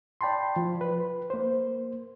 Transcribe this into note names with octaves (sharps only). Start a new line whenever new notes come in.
D5 G5 A5 B5 C6
F3
B4
A#3 C5